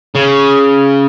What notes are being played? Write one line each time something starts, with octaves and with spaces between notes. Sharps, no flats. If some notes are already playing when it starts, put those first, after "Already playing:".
C#3